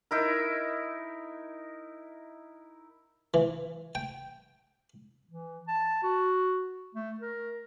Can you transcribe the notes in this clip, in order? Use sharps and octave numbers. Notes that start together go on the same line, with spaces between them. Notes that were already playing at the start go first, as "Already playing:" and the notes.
D#4 E4 A#4
E3
G5
E3
A5
F#4
A3
A#4